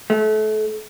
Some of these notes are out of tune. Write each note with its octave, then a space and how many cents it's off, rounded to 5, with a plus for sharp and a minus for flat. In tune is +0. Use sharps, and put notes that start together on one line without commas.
A3 -30